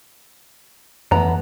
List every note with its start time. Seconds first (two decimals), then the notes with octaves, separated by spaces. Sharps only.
1.11 F2 E3 A3 B3 A#5